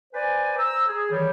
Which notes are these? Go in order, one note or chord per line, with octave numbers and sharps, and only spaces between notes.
B4 C5 D5 G#5
C5 A#5 E6
G#4
D#3 E3 G3 C#5